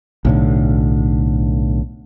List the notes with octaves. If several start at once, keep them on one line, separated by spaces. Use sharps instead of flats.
B1 A2 D3